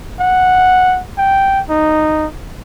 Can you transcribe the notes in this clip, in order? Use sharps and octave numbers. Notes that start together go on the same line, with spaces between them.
F#5
G5
D#4